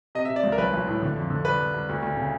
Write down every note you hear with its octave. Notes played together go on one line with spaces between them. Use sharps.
C3 D#5
E5
C3
D5
C#2
A#4
B1 B4
B1
A2
D3
F2
D3
C2 B4
C2
C2
D2
D2
C#3